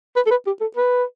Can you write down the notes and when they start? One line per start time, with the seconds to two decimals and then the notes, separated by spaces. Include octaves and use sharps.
0.16 B4
0.26 A4
0.31 B4
0.46 G4
0.61 A4
0.76 B4